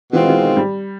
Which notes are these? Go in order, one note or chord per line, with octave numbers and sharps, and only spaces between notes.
B2 E3 G#3 C4 F4
E3
D#3
G3